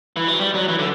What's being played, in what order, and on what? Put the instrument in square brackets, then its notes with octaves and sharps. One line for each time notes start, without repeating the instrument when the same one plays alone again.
[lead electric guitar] E3
F#3
G3
F#3
E3
D3